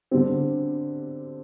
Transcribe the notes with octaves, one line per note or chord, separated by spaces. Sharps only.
D3 G3 C4